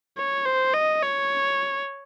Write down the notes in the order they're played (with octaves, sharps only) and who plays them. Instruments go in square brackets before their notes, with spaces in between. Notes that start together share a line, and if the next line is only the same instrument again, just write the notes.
[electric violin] C#5
C5
D#5
C#5